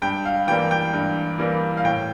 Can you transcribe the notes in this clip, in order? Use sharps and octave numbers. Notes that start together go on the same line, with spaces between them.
G2 G5
F5
E3 G3 A#3 G5
G5
G2
E3 G3 A#3
F5
A2 G5